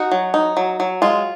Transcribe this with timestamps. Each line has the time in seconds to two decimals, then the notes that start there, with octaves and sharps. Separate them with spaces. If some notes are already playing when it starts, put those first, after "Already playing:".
Already playing: D#4 F#4
0.12 F#3
0.34 D#4
0.57 F#3
0.80 F#3
1.02 G#3 F4